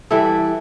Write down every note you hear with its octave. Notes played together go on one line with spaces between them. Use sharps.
E3 G3 E4 A4